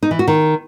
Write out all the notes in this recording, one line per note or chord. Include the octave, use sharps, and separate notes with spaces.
D#4
E3
F#4
D#3